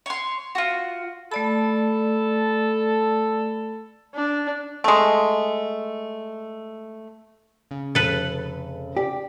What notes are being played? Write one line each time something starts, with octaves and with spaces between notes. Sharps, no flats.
C#5 C6
F4 F#4
A3 A4 D5 B5
D4
G#3 A3
C#3
F1 A4 B4
G4 D5